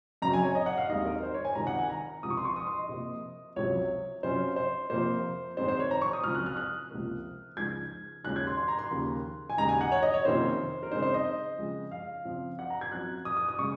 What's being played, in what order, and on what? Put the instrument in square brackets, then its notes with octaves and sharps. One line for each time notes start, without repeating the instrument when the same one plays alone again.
[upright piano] F#2 C#3 F#3 C4 A#5
G#5
C#5
D#5
F#5
F5
D#2 D#3 G#3 C4 D#4 D#5
A#4
C5
C#5
G#5
C#2 C3 D#3 A#5
F#5
G#5
A#5
C#2 C3 F3 D#6
C#6
C6
C#6
D#6
C6
D#5
C3 F3 A#3
C#2 C3 F#3 C#5
C3 F#3 C#4 F4 C5
C5
F2 C3 F3 A#3 C5
G#2 D#3 G#3 C4 D#4 C5
C5
C#5
A#5
C#6
D#6
C#2 C#3 F#3 C4 F4 F6
F#6
F6
F#6
C#2 C3 F3 A#3
C#2 C#3 F3 G#3 D#4 G#6
D#2 C#3 G#3 C#4 F4 F#6
G#6
C6
C6
A#5
C6
D#2 C#3 F3 A#3
G#5
D#2 C#3 G#3 D#4 A#5
G#5
F#5
C#5
D#5
C#5
F2 C3 D#3 A#3 C#4 C5
A#4
C#3 G#3 C4 D#4 C5
C5
D#5
F2 C#3 G#3
F5
C#3 F3 C4 F4
F#5
A#5
G#6
F#2 F3 C4 F#6
D#6
D#6
D#6
C#3 G#3 C#6